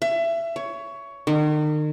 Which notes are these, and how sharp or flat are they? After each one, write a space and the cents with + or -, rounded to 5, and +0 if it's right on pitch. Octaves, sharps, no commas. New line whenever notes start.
E5 +25
C#5 +15
D#3 -40